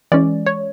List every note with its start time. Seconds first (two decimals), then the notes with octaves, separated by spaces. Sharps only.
0.12 E3 G#3 C#4 D5
0.46 C#5